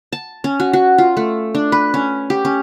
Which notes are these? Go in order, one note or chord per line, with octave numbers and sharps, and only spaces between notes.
A5
C#4
F#4
F#4
F4
A3
D4
B4
C#4
G4
C#4